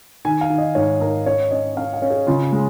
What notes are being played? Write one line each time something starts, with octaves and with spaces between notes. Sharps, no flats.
D#3 G#5
F5
D#3
D#5
G#2 C#5
G#2 A#4
C#4 C#5
C#4 D#5
C#4 F5
F5
C#4
G#4
C#3 F4
G#3